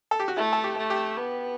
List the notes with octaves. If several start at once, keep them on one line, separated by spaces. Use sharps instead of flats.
A4
G4
F#4
A3 E4
A4
G4
A3
G4
B3